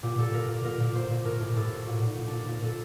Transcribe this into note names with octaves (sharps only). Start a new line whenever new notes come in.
A#2 G4
A#2 A4
A#2 A#4
A#2
A#2 A#4
A#2
A#2 C5
A#2
A2 A#4
A2 G4
A2 A4
A2
A#2 F#4
A#2 D#4
A#2
D4
A#2
A#2
A#4
A#2 A4